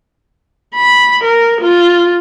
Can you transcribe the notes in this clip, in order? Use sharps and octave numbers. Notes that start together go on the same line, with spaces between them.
B5
A#4
F4